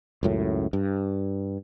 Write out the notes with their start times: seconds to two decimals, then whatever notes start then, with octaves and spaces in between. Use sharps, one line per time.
0.23 C#2 F#2 A2
0.73 G2